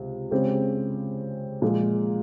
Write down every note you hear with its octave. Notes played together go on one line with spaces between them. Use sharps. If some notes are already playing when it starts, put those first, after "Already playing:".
Already playing: C#2 C3
C#3 G#3 C4 G4
A#2 F3 G#3